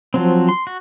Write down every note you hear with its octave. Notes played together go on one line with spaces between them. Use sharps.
F3 F#3 C4
C6
F#4